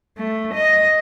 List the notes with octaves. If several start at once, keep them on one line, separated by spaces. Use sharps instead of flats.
A3
D#5